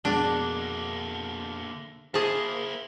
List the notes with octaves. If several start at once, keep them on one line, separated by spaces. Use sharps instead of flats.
F2 B2 D3 G#3 A#3 D4
A#3 E4 G#4 C5 A5